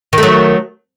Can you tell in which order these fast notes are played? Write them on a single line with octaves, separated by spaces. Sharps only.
D#3 A3 F#3